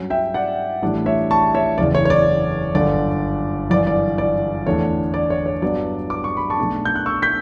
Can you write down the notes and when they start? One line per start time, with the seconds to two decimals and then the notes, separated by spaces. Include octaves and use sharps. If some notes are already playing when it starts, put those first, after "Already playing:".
Already playing: G2 F#3 C#4
0.10 E5 G5
0.34 D5 F#5
0.82 A1 A2 G3 D4 D5
1.06 C#5 E5
1.31 A5 C#6
1.55 C#5 E5
1.78 F#1 E2 C#3 D5
1.95 C#5
2.05 C#5
2.10 D5
2.75 G1 F#2 D3 D5
3.70 G1 F#2 E3 D5
3.87 D5
4.18 D5
4.67 E2 D3 A3 D4 C#5
5.14 D5
5.30 C#5
5.46 C#5
5.62 G2 F#3 B3 D4 D5
6.10 D6
6.24 C#6
6.37 B5
6.50 A5 C#6
6.58 B1 B2 A3 D4
6.85 G6
6.95 F#6
7.06 C#6 E6
7.22 G6 B6